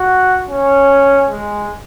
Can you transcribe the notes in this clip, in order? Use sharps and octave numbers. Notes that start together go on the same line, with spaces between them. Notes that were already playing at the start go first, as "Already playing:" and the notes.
Already playing: F#4
C#4
G#3